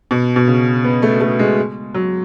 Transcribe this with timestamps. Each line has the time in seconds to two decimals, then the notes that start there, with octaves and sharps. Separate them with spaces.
0.11 B2
0.36 B2
0.47 C#3
0.84 B3
1.02 A3
1.21 A3
1.39 G#3
1.94 F#3